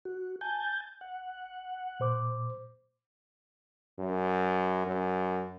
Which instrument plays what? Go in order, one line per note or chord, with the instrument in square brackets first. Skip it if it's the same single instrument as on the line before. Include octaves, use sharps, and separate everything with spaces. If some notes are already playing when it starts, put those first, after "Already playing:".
[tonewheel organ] F#4
G#5 A5 G6
F#5
[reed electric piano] A#2 C5 D6
[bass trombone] F#2
F#2